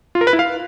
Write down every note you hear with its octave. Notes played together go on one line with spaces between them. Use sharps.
F4
A#4
B4
E4
F5